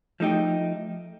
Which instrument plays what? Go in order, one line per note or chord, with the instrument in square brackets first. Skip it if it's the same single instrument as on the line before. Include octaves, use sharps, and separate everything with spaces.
[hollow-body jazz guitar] F3 A3 D#4 G4